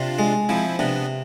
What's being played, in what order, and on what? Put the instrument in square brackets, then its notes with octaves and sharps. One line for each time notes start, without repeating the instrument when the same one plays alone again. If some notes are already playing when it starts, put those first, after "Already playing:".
Already playing: [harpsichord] C3 [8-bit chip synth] D4 F4
[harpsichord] G#3
[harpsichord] F3 [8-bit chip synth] C4 E4
[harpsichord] C3 [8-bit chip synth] B3 D4